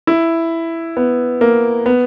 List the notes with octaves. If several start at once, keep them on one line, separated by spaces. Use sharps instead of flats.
E4
B3
A#3
B3